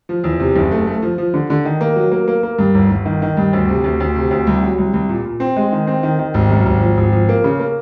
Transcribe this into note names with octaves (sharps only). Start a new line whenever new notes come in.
F3
E2
C3
F#1
A3
A3
F3
F3
D3
D3
D#3
A#3
F#3
A#3
A#3
A#3
G2
G1
G1
D#3
D#3
G2
D2
C3
D2
D2
C3
D2
C2
F#3
C2
C2
A#2
A#2
C4
G#3
D#3
C4
D#3
D#3
G#1
F#2
G#1
F3
G#1
F3
A#3
C#3
A#3